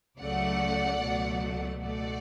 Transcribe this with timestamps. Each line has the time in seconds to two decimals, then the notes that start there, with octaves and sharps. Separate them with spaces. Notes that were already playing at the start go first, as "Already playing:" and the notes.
0.19 C#2 C#3 F#3 A3 D5 F#5
1.01 C#2 B2 F#3 A3
1.83 C#2 B2 A3 D5 F#5